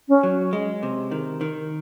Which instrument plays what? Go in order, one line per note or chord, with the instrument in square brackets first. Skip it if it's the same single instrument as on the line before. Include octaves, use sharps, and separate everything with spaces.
[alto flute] C#4
[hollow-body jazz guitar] F#3
G#3
C3
D#3
D#3